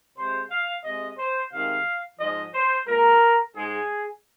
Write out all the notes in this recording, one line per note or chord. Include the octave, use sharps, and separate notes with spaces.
C3 G#3 C5
F5
C3 G#3 D#5
C5
C3 D#3 G#3 F5
G#2 F3 G#3 D#5
C5
A#2 G#3 A#4
G#2 G#3 G#4